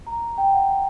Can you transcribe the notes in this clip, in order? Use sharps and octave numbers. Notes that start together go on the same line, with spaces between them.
A#5
G5
F#5